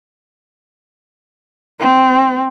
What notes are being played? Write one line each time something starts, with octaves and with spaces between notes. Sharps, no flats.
C4